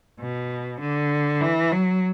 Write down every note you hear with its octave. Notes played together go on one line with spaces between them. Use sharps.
B2
D3
E3
F#3